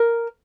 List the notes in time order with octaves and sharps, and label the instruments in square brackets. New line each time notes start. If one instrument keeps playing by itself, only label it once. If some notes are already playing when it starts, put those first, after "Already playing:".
Already playing: [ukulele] A#4